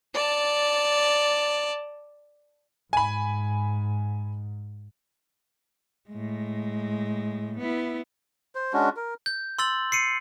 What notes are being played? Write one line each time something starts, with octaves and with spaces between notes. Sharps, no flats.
D5 A5
G#2 G#5 B5
A2 G#3
B3 E4
C5
G#3 C#4 D4 F#4
A#4
G6
C6 E6 A6 F#7
C7 C#7 D#7